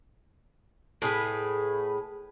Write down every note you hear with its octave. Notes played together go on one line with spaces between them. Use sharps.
A2 G#4 B4